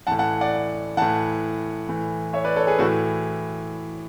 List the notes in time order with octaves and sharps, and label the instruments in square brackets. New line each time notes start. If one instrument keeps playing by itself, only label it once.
[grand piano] A2 E3 F#5 A5
F#5 A5
D5 F#5
A2 E3 F#5 A5
A2 E3
C#5 E5
B4 D5
A4 C#5
G#4 B4
A2 F#4 A4
E3